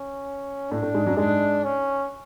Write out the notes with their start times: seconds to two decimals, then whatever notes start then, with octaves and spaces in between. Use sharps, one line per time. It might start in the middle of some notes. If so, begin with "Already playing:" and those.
Already playing: C#4
0.71 A2 A3 D4
0.83 A2 A3
0.94 G#2 G#3
1.06 F#2 F#3
1.17 G#2 G#3 D4
1.64 C#4